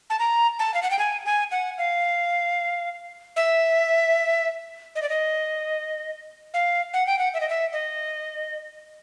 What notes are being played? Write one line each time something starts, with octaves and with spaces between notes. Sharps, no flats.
A5
A#5
A5
F5
F#5
G5
G#5
G#5
F#5
F5
E5
D#5
D5
D#5
F5
F#5
G5
F#5
E5
D#5
E5
D#5